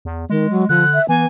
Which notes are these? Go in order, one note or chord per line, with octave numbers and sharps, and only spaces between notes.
E2
D#3 G#3
F#3
D3 F3 F#6
E5
E3 B3 G#5